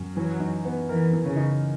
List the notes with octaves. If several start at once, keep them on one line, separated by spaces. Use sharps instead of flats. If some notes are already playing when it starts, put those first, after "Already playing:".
Already playing: F#2
E3 F#3
D#4
B3
E3 A#4
E3
C#3
D#4